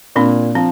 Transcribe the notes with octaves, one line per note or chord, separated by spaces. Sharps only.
A#2 C4 D4
F3 C4